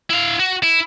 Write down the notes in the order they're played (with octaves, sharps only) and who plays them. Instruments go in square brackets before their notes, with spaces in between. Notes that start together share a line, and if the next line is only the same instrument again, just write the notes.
[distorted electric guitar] E4 F5
F#4
E4